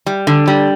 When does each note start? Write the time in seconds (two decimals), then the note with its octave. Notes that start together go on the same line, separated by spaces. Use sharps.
0.06 G3
0.27 D3
0.48 G3